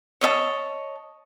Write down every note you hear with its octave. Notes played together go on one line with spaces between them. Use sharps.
C#5 D#5 E5 A5